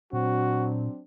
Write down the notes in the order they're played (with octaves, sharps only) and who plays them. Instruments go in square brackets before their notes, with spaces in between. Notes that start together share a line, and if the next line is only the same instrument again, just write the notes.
[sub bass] A#2 [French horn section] F#3 C4 D4 [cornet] F#4